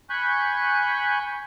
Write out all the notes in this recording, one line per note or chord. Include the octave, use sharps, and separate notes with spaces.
G#5 B5 C#6 F#6 G6